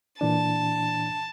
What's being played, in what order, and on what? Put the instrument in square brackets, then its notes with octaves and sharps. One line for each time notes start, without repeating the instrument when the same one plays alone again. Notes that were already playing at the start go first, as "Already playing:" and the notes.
[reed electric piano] A#2 E3 D4 [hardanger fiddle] A5